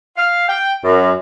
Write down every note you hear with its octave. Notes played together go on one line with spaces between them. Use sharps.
F5
G5
F#2